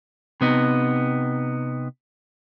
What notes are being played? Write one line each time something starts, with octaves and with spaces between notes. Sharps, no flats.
C3 B3 D#4